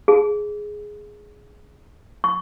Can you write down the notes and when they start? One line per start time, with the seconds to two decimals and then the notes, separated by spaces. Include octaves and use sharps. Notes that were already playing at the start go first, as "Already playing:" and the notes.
0.08 G#4
2.24 C#6